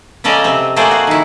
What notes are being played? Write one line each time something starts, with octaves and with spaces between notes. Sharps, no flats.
C#3 C#4 A4 D5 D#5 A#5
C3 C4
A3 A#3 G#4 C5 D5 F#5
F#4
D#3 E4